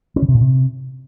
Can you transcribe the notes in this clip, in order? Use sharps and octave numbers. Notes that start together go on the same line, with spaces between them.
C#4
D3
C3
A#2
C3